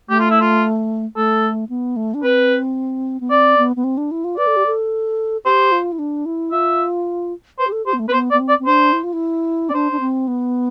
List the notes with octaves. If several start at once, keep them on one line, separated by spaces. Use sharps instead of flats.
A3 G4
F4
E4
F4
A3 A4
B3
A3
D4
C4 B4
B3
C4 D5
B3
B3
C4
D4
E4
F4
B4 D5
A4
G4
A4
G4 C5
F4
E4
D4
E4
F4 E5
B4 C5
G4
A4
G4 C5
B3
A3
C4 B4
B3 C5
D5
B3
C4
D5
C4
D4 C5
E4
F4
E4
C4 D5
D4 C5
D4
C4
B3